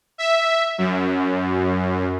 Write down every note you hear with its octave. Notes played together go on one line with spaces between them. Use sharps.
E5
F#2